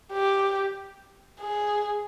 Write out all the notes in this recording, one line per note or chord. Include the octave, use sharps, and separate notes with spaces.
G4
G#4